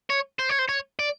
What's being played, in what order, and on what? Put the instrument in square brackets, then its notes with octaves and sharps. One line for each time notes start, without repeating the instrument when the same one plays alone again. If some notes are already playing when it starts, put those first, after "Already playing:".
[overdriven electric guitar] C#5
C5
C#5
C5
C#5
D5